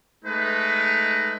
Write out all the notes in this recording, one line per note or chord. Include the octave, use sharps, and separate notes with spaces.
G#3 A3 D#4 B4